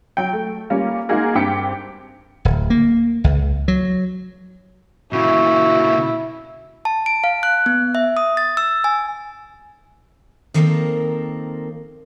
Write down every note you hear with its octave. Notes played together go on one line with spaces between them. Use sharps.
F#3 G5
A3
G3 A#3 C#4 F4
G#3 A#3 D#4 F#4 G#4 A#4
G2 C4 G5 D6 B6 C#7
D1
A#3
C#2
F#3
A#2 C#3 E4 F#4
A5
D7
F5
F#6
B3
E5
D#6
A6
E6
G#5
D#3 F3 A#3 C4 A4 A#4